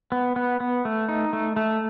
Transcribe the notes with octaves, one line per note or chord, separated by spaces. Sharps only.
B3
B3
B3
A3
D#4
A3
A3